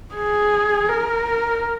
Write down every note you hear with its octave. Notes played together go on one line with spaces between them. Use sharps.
G#4
A#4